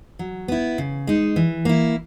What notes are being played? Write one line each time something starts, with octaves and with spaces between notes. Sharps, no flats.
F#3
B3 E4
C#3
G#3 D#4
E3
A#3 E4